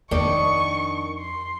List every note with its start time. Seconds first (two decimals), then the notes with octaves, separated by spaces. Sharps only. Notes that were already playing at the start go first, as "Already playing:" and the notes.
0.11 F2 D#3 D4 C#6
1.19 C6